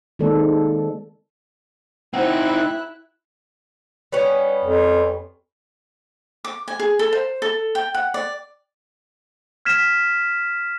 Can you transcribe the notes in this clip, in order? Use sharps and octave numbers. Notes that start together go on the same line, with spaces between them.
D#3 G#3 A#3 C4 A4 D5
C4 D#4 E4 C5 F#5 G5 F#6
G3 B3 C#4
F2
D6
G#5
G#4
A4
C5
A4
G5
F#5
D5
F6 G#6 B6 E7